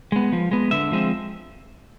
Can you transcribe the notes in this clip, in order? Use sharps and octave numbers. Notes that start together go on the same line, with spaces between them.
G#3 B3
F3
G#3 B3
D3 E5
F3 G#3 C4